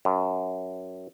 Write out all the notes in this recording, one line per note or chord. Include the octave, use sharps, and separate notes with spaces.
F#2